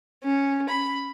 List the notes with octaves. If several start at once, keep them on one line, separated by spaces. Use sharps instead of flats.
C#4
B5